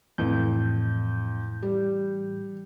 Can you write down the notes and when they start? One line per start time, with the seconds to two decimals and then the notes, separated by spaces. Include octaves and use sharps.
0.18 F2 A2 E3 G6
1.63 G3